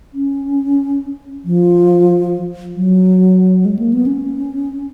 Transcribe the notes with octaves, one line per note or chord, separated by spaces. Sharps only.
C#4
F3
F#3
G#3
A#3
B3
C#4